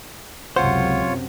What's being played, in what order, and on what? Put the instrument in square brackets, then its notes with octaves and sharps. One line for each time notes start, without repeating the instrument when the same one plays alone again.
[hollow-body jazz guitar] C#2 C5 [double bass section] F#2 C3 [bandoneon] F4 C#5 [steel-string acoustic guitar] F#5